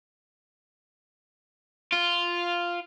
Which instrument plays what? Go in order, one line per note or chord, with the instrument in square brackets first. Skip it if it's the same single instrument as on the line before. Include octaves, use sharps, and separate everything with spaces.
[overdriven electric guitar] F4